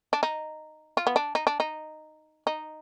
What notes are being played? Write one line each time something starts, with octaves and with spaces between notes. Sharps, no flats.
D4
D#4
F4
B3
D4
D#4
D4
D#4
D#4